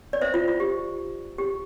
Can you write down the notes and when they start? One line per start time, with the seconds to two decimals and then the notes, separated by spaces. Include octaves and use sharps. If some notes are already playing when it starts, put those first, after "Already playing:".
0.13 D5
0.22 C5 E5
0.34 F4
0.48 F4
0.60 G4
1.38 G4